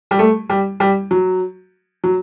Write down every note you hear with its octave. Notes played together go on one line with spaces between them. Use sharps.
G3
A3
G3
G3
F#3
F#3